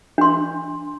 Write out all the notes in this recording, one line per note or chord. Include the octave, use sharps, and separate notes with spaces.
D4 C6